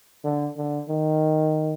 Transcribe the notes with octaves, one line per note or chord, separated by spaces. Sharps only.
D3
D3
D#3